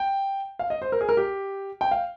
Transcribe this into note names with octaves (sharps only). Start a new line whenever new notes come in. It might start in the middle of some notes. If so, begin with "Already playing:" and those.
Already playing: G5
F5
D#5
C5
A#4
G#4
A#4
G4
G5
F5